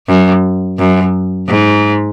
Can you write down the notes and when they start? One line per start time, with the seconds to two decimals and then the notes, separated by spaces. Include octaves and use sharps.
0.08 F#2
0.79 F#2
1.48 G#2